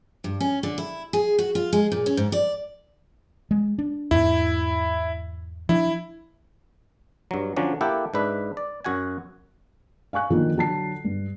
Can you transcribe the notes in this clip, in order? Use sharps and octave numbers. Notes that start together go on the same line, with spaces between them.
G2
C#4
D3
E4
G#4
F#4
F4
G#3
A#2
C#4
G#2
D5
G#3
D4
E2 G#2 E4
F3 D4 E4
G2 F#3
D3 F3 F#3 C#4 D4
A#3 E4 G4 A4 F#5
G#2 D4 B4 E5
D5
F#2 F#4 F#5 G#5
F5 G#5 C#6 F#6
D3 D#3 F3 F#3 A#3 D#4
D3 F#3 A5 C7
G2